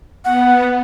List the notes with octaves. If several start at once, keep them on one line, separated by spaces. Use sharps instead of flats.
B3 F#5